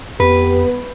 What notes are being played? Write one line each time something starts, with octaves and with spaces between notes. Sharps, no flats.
F2 B3 G4 B4